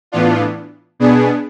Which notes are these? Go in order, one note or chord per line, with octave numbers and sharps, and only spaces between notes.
A2 E3 B3 D4 F4
B2 B3 D4 G#4